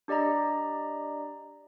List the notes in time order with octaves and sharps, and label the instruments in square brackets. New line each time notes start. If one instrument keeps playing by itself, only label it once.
[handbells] D4 G4 D5 D#5 A#5